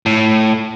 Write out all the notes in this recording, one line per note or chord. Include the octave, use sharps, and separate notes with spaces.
A2